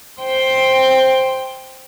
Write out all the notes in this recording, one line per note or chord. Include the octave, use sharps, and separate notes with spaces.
C5 G5